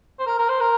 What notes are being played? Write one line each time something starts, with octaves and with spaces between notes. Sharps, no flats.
C5
A#4
A#4
C5
A#4